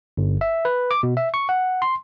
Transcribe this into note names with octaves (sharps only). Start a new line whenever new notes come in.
G1
E5
B4
D6
B2
E5
C#6
F#5
C6